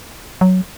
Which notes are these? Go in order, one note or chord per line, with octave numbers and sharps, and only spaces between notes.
F#3